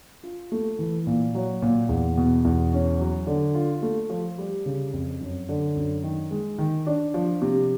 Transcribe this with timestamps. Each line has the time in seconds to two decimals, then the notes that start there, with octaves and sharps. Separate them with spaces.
0.23 F4
0.52 A3
0.79 E3
1.07 A#2
1.35 F#3
1.62 A#2
1.89 E2
2.17 B2
2.45 E2
2.73 C#4
3.00 F#3
3.27 D3
3.55 F4
3.82 A3
4.10 F3
4.38 G3
4.66 C#3
4.93 F2
5.21 F#2
5.49 D3
5.76 F#2
6.04 D#3
6.31 G#3
6.58 D#3
6.87 D4
7.14 F3
7.42 C3